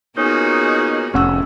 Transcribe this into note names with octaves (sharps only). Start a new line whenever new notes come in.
A#2 B3 C#4 D#4 F#4 G#4
F1 A2 C#4 F#5 E6